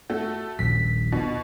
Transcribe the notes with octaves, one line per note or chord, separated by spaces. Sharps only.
A3 F#4 A4
D#1 A#1 B6
B2